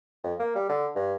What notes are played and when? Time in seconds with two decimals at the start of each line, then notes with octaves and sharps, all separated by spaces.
0.23 F2
0.39 A#3
0.55 G3
0.69 D3
0.95 G2